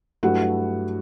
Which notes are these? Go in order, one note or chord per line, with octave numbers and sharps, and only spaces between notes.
G2 F#3 A3 E4 F#4 F#5